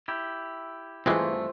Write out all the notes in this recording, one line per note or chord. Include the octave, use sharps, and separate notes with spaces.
E4 G4
G2 E3 G#3 A3 C4 F4 C5